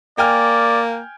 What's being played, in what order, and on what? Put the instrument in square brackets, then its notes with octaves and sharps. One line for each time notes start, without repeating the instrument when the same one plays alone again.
[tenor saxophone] A#3 [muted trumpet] D5 [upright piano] G5 G#5 F6